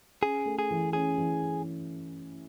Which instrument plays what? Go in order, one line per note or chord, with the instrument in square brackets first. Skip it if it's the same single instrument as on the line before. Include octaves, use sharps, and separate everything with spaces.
[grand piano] C#4 [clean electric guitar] G#4
[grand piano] A3
[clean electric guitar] G#4
[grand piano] E3
[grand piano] C#4 [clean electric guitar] G#4
[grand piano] E3